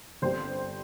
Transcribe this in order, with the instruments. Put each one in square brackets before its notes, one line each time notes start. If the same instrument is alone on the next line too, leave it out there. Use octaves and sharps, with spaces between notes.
[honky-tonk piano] G1 G2 G3 C4 C5